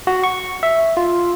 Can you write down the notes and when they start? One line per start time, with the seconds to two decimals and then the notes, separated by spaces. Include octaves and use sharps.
0.07 F#4
0.24 C#6
0.63 E5
0.97 F4